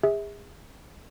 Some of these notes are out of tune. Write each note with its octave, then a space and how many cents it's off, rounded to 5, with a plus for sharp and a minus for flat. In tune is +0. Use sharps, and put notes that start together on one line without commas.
G#4 -35 E5 -30